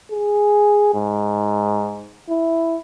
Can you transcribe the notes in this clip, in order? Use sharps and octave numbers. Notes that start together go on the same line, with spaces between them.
G#4
G#2
E4